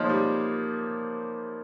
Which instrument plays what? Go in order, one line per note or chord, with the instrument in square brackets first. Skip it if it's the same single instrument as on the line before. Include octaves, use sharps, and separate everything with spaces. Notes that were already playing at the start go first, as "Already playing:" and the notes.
Already playing: [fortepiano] F3 G#3 [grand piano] A#3 D#4 A#4 C#5
[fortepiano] G3